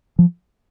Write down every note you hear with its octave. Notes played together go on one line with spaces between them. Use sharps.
F3